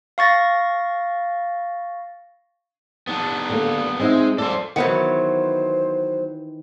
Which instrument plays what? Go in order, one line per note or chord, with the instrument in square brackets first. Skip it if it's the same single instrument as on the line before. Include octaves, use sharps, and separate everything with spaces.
[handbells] F5 C#6 A6 A#6
[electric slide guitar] B3 D4
[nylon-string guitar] D3 A#3
[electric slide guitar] G#3 [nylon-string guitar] C4 D#4 E5
[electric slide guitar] A4 C5 [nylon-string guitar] D5
[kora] D#3 E3 [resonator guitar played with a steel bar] F#3 B3 F#5 [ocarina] C5